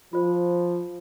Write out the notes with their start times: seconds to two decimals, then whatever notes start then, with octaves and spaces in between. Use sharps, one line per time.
0.13 F3 F4 C5